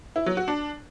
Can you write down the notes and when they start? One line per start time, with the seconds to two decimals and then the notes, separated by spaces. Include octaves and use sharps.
0.16 E4
0.26 F#3
0.37 F#4
0.48 D4